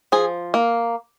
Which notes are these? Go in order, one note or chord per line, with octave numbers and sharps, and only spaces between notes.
F3 G#4
A#3